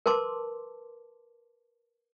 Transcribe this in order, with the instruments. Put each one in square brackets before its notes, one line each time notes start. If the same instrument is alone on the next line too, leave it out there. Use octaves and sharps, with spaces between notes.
[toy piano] A#4 B4 A5 C6 D6